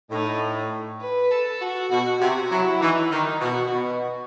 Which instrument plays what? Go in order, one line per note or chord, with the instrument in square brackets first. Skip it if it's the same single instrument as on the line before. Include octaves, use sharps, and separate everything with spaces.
[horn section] A2 [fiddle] D#4
[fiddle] B4
A4
F#4
[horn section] B2 [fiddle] F#4
[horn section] C3 [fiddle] F#4
[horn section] F#3 [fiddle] E4
[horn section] E3 [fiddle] D#4
[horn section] D#3 [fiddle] D#4
[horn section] B2 [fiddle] F#4
[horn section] B2